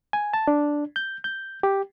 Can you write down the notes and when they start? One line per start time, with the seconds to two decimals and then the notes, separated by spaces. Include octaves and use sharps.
0.13 G#5
0.34 A5
0.48 D4
0.96 G6
1.24 G6
1.63 G4